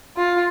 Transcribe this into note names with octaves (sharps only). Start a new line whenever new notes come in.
F4